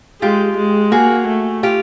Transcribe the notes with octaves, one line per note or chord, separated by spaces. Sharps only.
G#3 F4 G4
G#3
A#3 F#4 G#4
A3
F4 G4